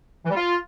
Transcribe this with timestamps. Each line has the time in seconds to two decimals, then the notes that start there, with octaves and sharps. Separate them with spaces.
0.25 E3
0.30 G3
0.35 F4